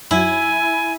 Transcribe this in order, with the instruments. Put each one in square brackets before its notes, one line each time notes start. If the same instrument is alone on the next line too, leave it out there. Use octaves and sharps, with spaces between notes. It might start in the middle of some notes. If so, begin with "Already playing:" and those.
[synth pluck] F#2 F#3 [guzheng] E4 [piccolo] G#5